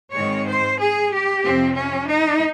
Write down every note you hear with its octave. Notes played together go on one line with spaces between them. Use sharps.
G#2 D#3 G#3 C4 C#5
C5
G#4
G4
F2 C3 F3 C4
C#4
D#4